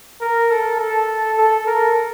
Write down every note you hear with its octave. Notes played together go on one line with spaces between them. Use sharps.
A#4
A4
A4
A4
A#4